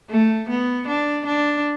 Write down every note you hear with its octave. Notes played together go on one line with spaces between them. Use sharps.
A3
B3
D4
D4